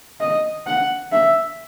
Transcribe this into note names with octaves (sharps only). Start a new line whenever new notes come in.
D#5
F#5
E5